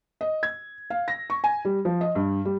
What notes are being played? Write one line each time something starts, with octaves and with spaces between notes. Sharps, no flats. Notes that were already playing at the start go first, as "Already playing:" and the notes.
D#5
G#6
F5
A#6
C#6
G#5
G3
F3
D#5
G2
G3